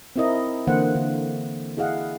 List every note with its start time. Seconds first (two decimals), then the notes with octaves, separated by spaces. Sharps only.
0.16 C4 D#4 E4 A#4 D#5
0.67 D3 E3 A#3 C5 F#5
0.95 D3
1.77 E4 G#4 D#5 F5 F#5